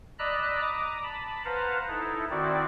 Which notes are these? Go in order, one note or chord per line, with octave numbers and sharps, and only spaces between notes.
D5 D#5 A#5 B5 E6 F#6
A#5 D6 D#6
A5 B5
B4 C5 F5 F#5 A5 A#5
D#4 E4 A4
D#3 C4 E4 F#4 D5